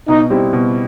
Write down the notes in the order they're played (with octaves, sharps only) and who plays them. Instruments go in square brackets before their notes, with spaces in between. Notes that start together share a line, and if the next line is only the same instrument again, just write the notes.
[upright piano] B2 [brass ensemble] D#4
[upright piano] G3 C4 E4 G4
B2